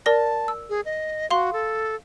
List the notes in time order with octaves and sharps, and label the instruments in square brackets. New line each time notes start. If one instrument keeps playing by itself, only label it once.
[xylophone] A#4 D5 A#6 [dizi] A5
[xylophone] E6
[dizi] G#4
D#5
[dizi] F#4 [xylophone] F5 C6
[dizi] A4